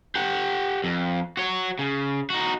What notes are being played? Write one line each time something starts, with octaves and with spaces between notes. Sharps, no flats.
G4 F#5
F2
F#4 C#5
C#3
D#4 F#4